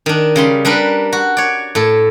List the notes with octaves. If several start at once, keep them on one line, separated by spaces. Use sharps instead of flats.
D#3 D4
C#3 G3 C6
G3 D4 A#4 B4
F#4
C#5 D5
A2 A4